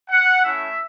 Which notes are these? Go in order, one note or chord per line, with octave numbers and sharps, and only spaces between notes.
F#5
A3 C#4 E4 E5